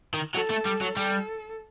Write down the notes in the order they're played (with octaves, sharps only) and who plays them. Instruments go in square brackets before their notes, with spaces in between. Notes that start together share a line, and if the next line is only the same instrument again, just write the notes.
[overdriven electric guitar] D#3
[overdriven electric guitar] F#3 [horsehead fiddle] A4
[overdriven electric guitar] A3
G3
F#3
[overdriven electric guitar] G3 [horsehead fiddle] A4